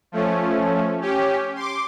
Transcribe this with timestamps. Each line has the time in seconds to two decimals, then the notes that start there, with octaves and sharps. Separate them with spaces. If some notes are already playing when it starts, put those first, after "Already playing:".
0.12 F3 A3 C#4
1.01 C#4 G4
1.55 C6 D6